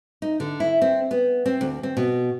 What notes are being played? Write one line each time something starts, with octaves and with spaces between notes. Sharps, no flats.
D#4
D3
E4
C4
B3
C4
D2
C4
B2